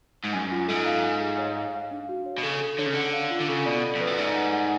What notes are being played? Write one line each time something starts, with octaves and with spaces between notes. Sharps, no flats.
G#2
F#2 G#5
F4
G#2 A4
F5
G#5
G#4
C#5
F5
F5
D4
F#4
C#5
B2
C#3 A4
A4
D3 C#5
C#3
D3 F#5
F5
F4
D3
C#3 A4
B2 D5
B5
F2
B4
F#2
G#2 D5
F#5
F#5